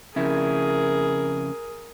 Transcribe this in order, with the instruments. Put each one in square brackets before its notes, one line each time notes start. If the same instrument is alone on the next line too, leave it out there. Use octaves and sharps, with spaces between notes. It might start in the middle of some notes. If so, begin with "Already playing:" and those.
[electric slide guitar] F2 C#3 E4 [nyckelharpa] G#4 A#4